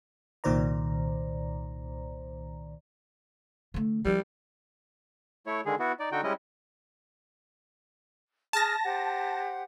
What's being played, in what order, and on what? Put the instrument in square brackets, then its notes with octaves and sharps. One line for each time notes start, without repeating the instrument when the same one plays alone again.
[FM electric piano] C2 A#2 D#3 C5 D5 A#5
[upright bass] D3 A3
[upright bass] F3 C#4 [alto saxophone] G3
[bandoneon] A3 E4 C#5
D3 D#3 G#3 G#4
B3 E4 F#4
D#4 D5
D3 D#4 F#4 G5
G3 G#3 C#4 E4 D#5
[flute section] G#4 F6 [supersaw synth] A5 A#6
[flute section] G4 C5 F#5